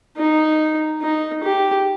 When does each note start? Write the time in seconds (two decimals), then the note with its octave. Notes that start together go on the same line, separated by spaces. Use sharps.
0.17 D#4
1.02 D#4
1.44 G4